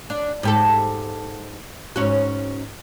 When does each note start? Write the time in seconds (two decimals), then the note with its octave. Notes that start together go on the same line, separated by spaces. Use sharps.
0.10 D4
0.43 G#2 G4 A4
1.96 G#2 C#4 F#4